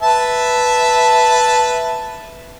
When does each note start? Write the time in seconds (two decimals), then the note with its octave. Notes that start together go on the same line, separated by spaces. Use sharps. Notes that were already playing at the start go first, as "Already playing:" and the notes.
0.01 B4 E5 A5